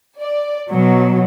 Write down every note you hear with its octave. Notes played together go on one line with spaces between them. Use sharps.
D5
B2 F#3